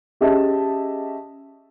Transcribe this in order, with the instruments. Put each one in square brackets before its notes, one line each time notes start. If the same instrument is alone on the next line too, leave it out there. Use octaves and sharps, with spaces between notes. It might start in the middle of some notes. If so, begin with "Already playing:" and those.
[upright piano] C#4 G4 G#4 D#5 E5 A5